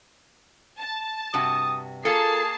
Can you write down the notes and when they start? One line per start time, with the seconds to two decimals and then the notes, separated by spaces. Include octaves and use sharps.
0.79 A5
1.34 G2 C3 F#4 D#6
2.05 A#3 F4 G#4 A4 A5 C7